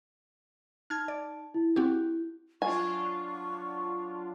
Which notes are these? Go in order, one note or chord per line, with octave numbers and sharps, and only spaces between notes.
D#4 A5 F6 G#6
D5
E4
C4 F#4 G4
F#3 D4 F4 G#5 C#6